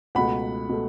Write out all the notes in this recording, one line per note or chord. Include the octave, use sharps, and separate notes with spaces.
C#2 B2 A3 F#5 B5
B2 A3